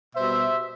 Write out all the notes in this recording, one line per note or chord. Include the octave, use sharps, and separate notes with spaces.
B2 G3 C5 E5